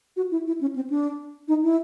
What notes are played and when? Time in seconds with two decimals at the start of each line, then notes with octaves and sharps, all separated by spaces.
0.17 F#4
0.31 E4
0.47 E4
0.61 C#4
0.76 C4
0.90 D4
1.48 D#4
1.63 E4